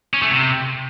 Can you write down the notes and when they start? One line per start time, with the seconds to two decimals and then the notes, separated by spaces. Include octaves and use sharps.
0.14 C#4
0.22 A3
0.31 C3